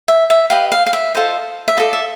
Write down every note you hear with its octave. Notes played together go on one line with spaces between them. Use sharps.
E5
E5
G4 B4 D#5 F5
F5
F5
E5
F4 A4 C5 D#5
E5
F4 A4 D5 D#5
E5